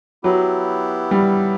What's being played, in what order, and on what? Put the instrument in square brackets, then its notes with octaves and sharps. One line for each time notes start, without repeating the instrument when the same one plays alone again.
[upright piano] F#3 [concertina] B3 E4 G4
[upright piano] G3